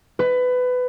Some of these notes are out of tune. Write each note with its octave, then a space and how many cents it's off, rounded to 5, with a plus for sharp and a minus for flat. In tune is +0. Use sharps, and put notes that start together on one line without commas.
B4 +20